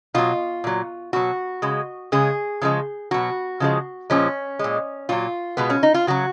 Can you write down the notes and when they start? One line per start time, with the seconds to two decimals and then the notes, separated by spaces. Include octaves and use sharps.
0.14 B2 F#3 F4
0.64 A#2 F#3
1.13 B2 F#3 F#4
1.62 C#3 G#3
2.12 C#3 G#3 G#4
2.62 C#3 F3 G#3
3.11 B2 F#3 F#4
3.60 C#3 F3 G#3
4.10 A#2 F3 G#3 C#4
4.59 A#2 G#3
5.09 A#2 F#3 F4
5.57 B2 G#3 B3
5.70 C#4
5.83 D#4
5.94 F4
6.07 C#3 F#3 F#4